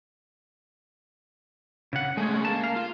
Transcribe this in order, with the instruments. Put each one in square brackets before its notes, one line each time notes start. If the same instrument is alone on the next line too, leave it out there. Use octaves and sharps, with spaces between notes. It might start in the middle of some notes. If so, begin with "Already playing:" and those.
[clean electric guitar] C#3 F#5
[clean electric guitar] G#3 C#4 [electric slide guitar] A3 G#4
[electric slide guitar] A#3 [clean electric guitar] A5
[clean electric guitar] F5
[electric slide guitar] F4